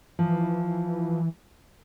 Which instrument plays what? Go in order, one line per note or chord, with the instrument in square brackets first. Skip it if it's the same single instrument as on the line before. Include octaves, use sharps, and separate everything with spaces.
[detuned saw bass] E3 [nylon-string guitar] F3